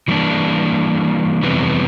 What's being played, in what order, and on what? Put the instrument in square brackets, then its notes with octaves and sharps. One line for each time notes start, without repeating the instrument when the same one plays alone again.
[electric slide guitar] E3 G3 A#3 D4
F2 C3 E3 G3 B3